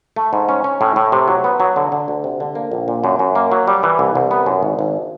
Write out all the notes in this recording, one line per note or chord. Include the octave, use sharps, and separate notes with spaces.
A3
G#2
C#4
C#4
A2
A2
C3
F#3
B3
F#3
D3
D3
D2
C3
D3
A#3
A#1
A#2
F#2
F#2
A#3
F#3
G3
E3
C2
C2
B3
F#2
G#1
G#1